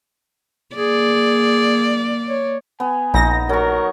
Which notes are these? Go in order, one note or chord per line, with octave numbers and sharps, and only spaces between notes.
A#3 G#4 D5
C#5
B3 G#5
A#1 D#4 A#6
F#3 A#4 C#6